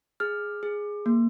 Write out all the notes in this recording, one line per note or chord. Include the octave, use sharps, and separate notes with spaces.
G#4 F6
G#4
A#3